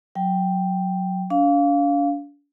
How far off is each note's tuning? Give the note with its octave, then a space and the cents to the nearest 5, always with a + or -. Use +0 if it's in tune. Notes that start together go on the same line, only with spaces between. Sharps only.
F#3 -5 G5 +0
D4 -40 F5 +0